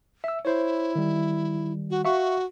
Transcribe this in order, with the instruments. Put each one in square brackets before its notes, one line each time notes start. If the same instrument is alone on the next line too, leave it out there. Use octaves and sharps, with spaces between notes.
[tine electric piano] E5 E6
[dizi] E4 [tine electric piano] C5 C#5
[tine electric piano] D#3 G3
[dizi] F#4
[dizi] F#4 [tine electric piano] E5 F5 C#6